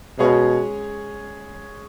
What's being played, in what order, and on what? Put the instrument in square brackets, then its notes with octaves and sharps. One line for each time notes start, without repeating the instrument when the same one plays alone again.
[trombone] B2 [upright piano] G#3 C#4 G#4 C#5